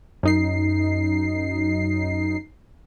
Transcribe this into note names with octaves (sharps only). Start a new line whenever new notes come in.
F#2 D#4 C7